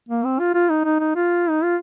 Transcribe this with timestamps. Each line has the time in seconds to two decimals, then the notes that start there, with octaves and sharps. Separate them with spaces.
0.09 A#3
0.24 C4
0.39 F4
0.54 F4
0.70 D#4
0.85 D#4
0.99 D#4
1.16 F4
1.50 D#4
1.63 F4